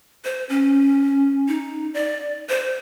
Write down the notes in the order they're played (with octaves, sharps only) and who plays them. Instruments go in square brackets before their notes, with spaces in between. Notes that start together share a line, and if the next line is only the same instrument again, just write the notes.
[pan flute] C5
C#4
D#4
D5
C5